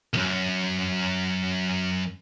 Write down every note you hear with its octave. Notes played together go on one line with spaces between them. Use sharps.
B1 F#2